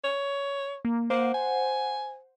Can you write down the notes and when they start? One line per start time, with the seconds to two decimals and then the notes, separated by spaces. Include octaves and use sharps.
0.04 C#5
0.85 A#3
1.10 A#3 C5 F#5
1.34 G#5